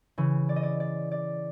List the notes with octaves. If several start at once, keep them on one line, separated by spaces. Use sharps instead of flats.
C#3 E3
D5
D#5
D5
D5
D5